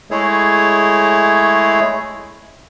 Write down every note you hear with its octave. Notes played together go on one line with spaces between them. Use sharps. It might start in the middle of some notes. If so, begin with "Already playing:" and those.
G#3 A3 E4 G#4 C#5